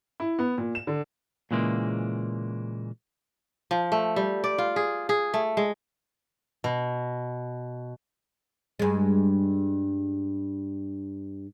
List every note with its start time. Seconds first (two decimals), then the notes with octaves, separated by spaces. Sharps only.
0.20 E4
0.39 B3
0.58 A#2
0.75 E7
0.87 D3
1.51 A#2 C#3 E3 G#3 A#3
3.71 F3
3.92 A3
4.16 G3
4.44 D5
4.58 F4
4.76 G#4
5.09 G#4
5.34 A3
5.57 G#3
6.64 B2
8.79 G2 G#3